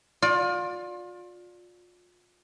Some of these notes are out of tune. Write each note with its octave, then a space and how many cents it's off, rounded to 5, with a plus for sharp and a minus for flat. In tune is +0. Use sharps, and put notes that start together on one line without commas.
F4 +30 D5 +0